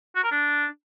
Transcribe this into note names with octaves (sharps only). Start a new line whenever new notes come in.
F#4
A#4
D4